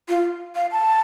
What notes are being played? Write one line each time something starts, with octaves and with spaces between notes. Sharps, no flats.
F4
F5
A5